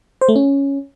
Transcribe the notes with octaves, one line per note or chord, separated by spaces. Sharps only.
C5
A3
C#4